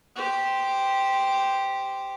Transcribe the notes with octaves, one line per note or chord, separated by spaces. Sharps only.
G4 C5